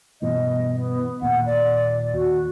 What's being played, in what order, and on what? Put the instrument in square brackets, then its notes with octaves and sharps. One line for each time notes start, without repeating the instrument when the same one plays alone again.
[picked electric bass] G2 B2 E3 [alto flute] D#5
[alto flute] B3
[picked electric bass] D#2 A#2 [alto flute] F#5
[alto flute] D5
[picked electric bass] D#2 [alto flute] F#4